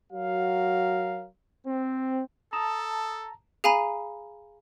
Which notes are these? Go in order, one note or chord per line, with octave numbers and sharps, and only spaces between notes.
F#3 F#4 A#4 F5
C4
A4 A5 A#5 D#6 E7
G#4 F5 G#5 A#5 B5 D#7